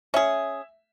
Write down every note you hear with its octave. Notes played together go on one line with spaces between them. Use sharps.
C#4 G#4 E5